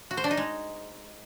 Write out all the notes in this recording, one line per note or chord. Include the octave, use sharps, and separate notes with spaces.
F#4
C5
D4
D#4
G#3